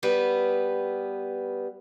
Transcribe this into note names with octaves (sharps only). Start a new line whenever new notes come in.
G3 B3 B4